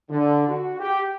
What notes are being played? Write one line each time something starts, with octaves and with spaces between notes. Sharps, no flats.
D3
F#4
G4